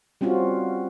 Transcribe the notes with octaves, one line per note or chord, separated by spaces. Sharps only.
G3 C4 C#4 F4 F#4